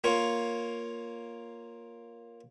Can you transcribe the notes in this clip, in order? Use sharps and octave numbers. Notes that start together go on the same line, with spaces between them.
A#3 F4 C#5